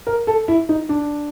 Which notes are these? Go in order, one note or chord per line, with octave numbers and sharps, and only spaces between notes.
A#4
A4
E4
D#4
D4